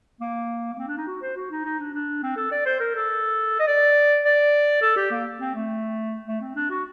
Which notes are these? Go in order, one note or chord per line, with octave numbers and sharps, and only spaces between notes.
A#3
A#3
C4
D4
D#4
F#4
C5
F#4
D#4
D#4
D4
D4
C4
A4
D5
C5
A#4
A4
D#5
D5
D5
A4
G4
A#3
C4
A3
A3
C4
D4
F#4